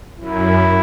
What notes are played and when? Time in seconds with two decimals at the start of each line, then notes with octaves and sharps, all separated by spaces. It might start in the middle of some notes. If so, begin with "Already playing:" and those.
0.20 F#2 E4